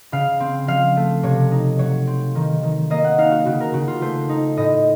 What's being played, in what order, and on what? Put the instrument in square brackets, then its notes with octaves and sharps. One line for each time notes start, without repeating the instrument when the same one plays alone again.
[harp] C#3 F5
C4
F3 F5
A3
C3 C#5
D#4
F#3 C#5
C4
D#3
D#3
A#3 D#5
F#5
D#4 F5
F#4
C#3 F#4
A#4
C#3 F#4
F4
A3 C5
D#4
A2 D#5